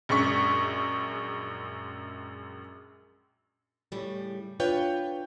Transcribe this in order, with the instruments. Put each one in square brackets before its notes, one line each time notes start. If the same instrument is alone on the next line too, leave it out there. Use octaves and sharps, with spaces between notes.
[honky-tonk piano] A#1 F#2 G#3 C#6 B6
[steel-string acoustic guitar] A2 C#3 G3
D4 F4 B4 C#5 G5